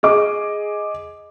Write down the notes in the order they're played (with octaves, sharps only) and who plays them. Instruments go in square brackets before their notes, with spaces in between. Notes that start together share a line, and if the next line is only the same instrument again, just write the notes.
[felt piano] G#4 D#5 D6